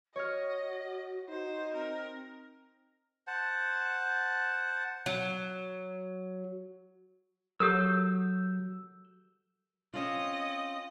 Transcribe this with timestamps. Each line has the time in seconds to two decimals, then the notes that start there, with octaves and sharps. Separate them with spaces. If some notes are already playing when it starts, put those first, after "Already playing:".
0.16 F#4 C#5 D#5 F6
1.29 D#4 F#4 C5
1.73 C4 A#4
3.27 C5 F#5 A5
5.06 F#3
7.60 F#3 G4 A4 A#4 E6 G6
9.94 C4 C#4 F4 D#5